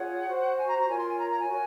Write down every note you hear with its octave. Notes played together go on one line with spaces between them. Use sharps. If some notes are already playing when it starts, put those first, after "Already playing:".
Already playing: F4 G#4 C#5 F#5
F#4 C5
G#5
A#5
A#5
F4 A#4 C#5 G#5
C6
G#5
A#5
A#5
G#5
F#4 A#4 C#5